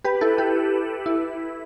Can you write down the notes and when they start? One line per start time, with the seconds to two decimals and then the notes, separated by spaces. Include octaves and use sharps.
0.04 G4 B4
0.21 E4 A4
0.38 G4
1.06 E4